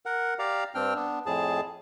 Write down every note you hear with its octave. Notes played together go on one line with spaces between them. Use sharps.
A#4 F#5
G4 D5 F5 A#5
G2 C4 D4 G5 F6
B3 D4
F2 A2 G#4 A5